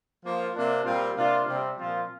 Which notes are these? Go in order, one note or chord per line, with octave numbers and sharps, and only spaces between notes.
F3 A#3 F4
C3 A#3 D4
A#2 G3 C4 F4
C3 A#3 D4 F4
C3 G3 C4
A#2 F3 C4 F4